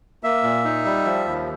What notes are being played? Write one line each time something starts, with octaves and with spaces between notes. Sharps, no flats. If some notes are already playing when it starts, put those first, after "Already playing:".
A#3 E5
A#2
D#4
G3
F3
D#2